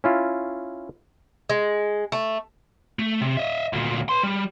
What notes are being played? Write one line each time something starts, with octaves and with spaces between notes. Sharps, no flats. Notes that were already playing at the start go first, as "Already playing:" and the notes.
C#4 E4 F4
G#3
A3
A3
C3
D#5 E5
D2 A#2
B4 C6
G3